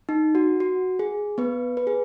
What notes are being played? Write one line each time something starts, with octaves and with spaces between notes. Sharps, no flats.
D#4
F#4
F#4
G#4
B3 B4
B4
G#4